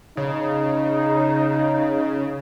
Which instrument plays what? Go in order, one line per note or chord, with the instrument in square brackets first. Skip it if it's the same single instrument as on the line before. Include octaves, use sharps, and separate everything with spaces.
[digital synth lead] C#3 [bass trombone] D#4 [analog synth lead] C#5